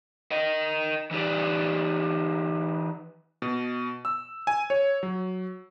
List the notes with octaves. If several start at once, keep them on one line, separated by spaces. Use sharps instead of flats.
A#4 D#5
E3 D#4 G4 D5
B2
E6
G#5
C#5
F#3